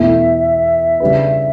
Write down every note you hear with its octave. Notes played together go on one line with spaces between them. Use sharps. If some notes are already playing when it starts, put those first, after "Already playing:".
Already playing: E2 B2 A3 E4 E5
C#3 G3 D4 G4 B4